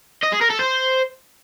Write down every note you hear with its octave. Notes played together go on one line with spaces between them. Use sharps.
D#5
G#4
A#4
A4
C5